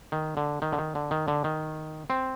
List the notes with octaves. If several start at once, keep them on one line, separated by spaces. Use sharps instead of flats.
D#3
D3
D#3
D3
D#3
D3
D#3
D3
D#3
C4